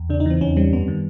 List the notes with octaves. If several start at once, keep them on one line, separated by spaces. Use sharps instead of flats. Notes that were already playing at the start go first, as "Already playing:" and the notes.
Already playing: E2
C#3 D4
D#4
E3 C4
E2 C#4
G3 C4
F#2 B3
D#3